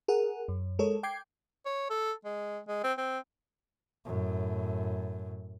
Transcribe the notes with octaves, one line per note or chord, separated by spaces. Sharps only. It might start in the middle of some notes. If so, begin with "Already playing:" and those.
G#4 A#4 F#5
F#2
G#3 A4 A#4 C#5
G5 D6 G6 G#6 C7
C#5
A4
G#3
G#3
C4
C4
F#2 A2